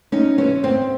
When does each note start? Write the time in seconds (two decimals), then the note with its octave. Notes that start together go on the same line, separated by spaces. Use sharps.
0.12 D2 C#4 D#4
0.38 C3 E3 C#4
0.64 D2 C4